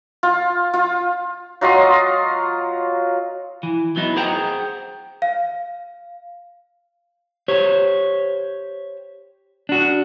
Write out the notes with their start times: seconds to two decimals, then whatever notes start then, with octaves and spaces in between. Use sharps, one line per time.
0.23 F4
0.74 F4
1.61 F#3 F4 D#5 C6
3.63 E3
3.96 F#3 B3 D#4 E4
4.16 G#4 C5 F#5 G5 A#5
5.22 F5
7.48 G4 C5 C#5
9.69 D4 F#4